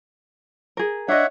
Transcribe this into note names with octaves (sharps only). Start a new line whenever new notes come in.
G#4 A#4
D4 C#5 D#5 E5 F#5